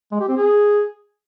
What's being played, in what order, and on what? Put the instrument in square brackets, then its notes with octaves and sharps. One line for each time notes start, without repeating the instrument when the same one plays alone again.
[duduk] G#3
G4
C4
G#4